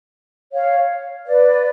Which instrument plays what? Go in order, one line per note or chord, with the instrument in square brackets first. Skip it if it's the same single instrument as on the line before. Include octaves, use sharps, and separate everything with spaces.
[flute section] C#5 F5
B4 D5